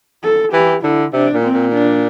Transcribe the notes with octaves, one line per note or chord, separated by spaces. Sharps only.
A4
E3 G4
D3 E4
C3 D4
A#2
C4
A#2
D4